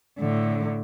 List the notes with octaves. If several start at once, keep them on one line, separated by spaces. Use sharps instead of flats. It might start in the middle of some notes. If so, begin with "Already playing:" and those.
A2 D3